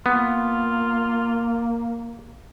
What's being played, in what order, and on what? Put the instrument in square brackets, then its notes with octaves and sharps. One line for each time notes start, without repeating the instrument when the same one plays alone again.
[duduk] A#3 [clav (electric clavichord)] B3 [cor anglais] F4